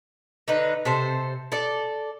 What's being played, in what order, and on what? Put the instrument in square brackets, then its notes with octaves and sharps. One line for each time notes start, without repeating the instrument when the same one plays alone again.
[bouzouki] D3 D#4 B4
C3 A4 C5
A4 D5